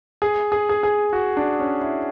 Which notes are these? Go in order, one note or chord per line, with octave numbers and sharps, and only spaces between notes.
G#4
G#4
G#4
G#4
F#4
D4
C#4
E4